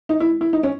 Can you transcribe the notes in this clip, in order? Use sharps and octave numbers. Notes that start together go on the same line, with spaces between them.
D#4
E4
E4
D#4
C#4